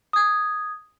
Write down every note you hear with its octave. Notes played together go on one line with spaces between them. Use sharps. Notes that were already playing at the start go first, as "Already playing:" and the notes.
D#6 G#6